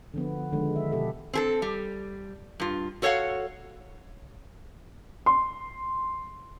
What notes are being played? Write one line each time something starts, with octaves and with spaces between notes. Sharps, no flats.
D3 F3 B3
D3 D#3 F3 G#3
E5
B2 G4 A4 E5
C4 G#4 A4
G3
G2 F4
F#4 A4 C#5 D#5 F5 F#5
C6